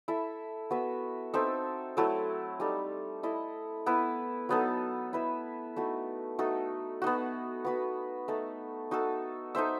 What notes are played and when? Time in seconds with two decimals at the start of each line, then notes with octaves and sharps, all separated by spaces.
0.08 E4 A4 E5
0.71 B3 F#4 B4 E5
1.34 C4 D#4 A4 E5
1.97 F#3 A3 E4 A4
2.60 G3 D#4 A4
3.23 E4 A4 D#5
3.86 B3 E4 B4
4.49 F#3 B3 D#4 A4
5.13 E4 B4 E5
5.76 A3 D#4 F#4
6.39 A3 D#4 F#4 A4
7.02 B3 D#4 F#4
7.65 B3 F#4 B4
8.28 A3 D#4 A4
8.91 D#4 F#4 A4
9.55 D#4 A4 C5 E5